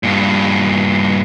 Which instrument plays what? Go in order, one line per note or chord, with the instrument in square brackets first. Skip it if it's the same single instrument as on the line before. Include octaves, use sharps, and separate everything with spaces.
[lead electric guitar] G2 A#2